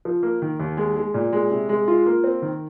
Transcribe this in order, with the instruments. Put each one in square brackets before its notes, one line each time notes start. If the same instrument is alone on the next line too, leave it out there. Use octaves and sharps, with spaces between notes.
[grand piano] F3
A#3
D#3
D#2
G#3
G#3
A#2
G#3
C3
G#3
F4
A#3
C4
D#3